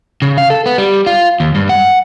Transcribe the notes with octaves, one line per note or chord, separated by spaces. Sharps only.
C#3
F5
A4
B3
G3
F4
D#2
G2
F#5